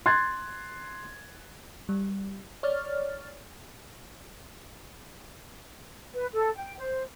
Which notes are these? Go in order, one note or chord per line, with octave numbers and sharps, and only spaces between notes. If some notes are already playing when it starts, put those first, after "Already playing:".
C6 F#6 G#6 A6
G3
C#5 D5 F6 A6
B4
A4
G5
C5